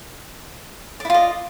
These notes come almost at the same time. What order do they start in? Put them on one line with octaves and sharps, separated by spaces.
D5 E4 F4 D#5